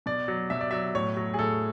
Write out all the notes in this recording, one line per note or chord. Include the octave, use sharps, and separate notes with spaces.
B2 D5
F#3
B2 E5
D5
F#3 E5
A2 C#5
F#3
G#4
A2 A4